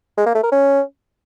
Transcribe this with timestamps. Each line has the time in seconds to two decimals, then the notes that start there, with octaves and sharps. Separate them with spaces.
0.17 G#3
0.26 A#3
0.35 A3
0.43 A#4
0.52 C#4